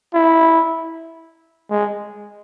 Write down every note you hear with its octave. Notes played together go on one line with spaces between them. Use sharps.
E4
G#3